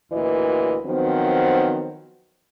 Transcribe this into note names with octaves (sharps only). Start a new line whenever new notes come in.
D2 A#2 E3 F#4 D#5
D#3 F3 F#3 B3 C4